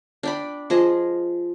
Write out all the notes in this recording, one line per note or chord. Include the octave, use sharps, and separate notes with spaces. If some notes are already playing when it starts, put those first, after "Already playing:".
D4 G5 B5
F3 G#4 D#5